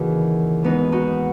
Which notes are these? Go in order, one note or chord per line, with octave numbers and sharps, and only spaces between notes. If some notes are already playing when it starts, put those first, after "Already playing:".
Already playing: D#2 C#3 E3 E4 F#4 G#4
G#2 D#3 B3 D#4
D#4 F#4